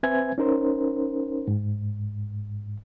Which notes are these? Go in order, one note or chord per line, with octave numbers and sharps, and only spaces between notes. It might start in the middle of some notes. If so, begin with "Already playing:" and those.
C4 B4 C5 E5 G#5 G#6
C#4 D#4 A#4 C5 C#5
G#2